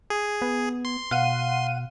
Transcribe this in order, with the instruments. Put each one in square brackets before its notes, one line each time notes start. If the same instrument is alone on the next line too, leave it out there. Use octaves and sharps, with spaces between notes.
[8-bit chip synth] G#4
[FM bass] B3
[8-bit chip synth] C6
[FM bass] B2 [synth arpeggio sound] F5 F#5 D#7